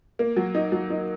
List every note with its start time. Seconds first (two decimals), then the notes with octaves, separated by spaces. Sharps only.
0.19 A#3
0.37 F#3
0.55 D#4
0.72 F#3
0.90 D#4